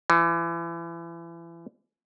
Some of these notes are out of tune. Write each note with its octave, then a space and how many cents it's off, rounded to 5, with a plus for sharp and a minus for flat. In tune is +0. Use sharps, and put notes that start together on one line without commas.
E3 +35